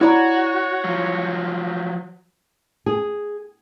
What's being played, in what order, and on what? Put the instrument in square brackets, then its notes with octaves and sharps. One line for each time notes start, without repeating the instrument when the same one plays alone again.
[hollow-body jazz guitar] E4 D5 A#5 [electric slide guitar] F#4 [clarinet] C#5
[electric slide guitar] F3 F#3
[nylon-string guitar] G#4